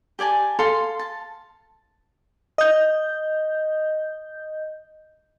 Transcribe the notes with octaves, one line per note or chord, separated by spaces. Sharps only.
G4 D5 G#5 A5
A4 F5 C6
A5
D#5 G6